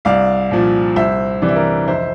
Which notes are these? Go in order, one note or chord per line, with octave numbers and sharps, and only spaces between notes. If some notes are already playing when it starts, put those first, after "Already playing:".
C2 D5 F5
A#2 F3
C2 C5 E5
C3 E3 D5
E5
A#4 D5
F1 C5 E5